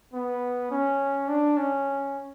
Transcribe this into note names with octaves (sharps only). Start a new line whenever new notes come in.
B3
C#4
D4
C#4